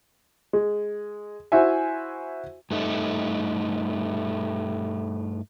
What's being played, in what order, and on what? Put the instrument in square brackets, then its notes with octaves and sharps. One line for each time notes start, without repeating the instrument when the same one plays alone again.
[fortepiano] G#3
E4 F#4 C5 E5 G#5
[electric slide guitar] G2 A3 D#4